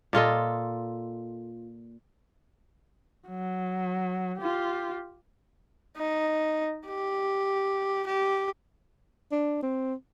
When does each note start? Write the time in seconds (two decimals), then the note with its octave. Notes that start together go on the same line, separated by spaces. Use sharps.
0.13 A#2 F4 A4 D#5
3.28 F#3
4.38 F4 G4
5.97 D#4
6.86 G4
8.07 G4
9.31 D4
9.62 C4